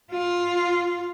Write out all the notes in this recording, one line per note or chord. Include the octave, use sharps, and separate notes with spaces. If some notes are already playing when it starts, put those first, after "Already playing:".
F4